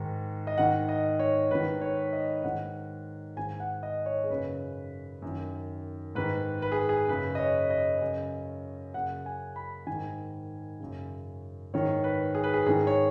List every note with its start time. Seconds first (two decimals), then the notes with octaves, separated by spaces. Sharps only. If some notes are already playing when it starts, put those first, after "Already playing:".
Already playing: G#2 D#3
0.47 D#5
0.58 G#2 D#3 F#5
0.89 D#5
1.19 C#5
1.51 G#2 D#3 B4
1.81 C#5
2.13 D#5
2.43 G#2 D#3 F#5
3.36 G#2 D#3 G#5
3.60 F#5
3.83 D#5
4.06 C#5
4.24 G#4
4.30 F#2 C#3 B4
5.22 F#2 D#3
6.15 G#2 D#3 B4
6.62 B4
6.72 G#4
6.89 G#4
7.08 F#2 C#3 B4
7.35 D#5
7.39 C#5
7.70 D#5
8.01 F#2 C#3
8.94 F#2 C#3 F#5
9.26 G#5
9.56 B5
9.87 G#2 D#3 G#5
10.80 F#2 C#3
11.73 G#2 D#3 C#5
12.04 B4
12.35 G#4
12.44 B4
12.54 G#4
12.66 G#2 D#3 G#4
12.87 C#5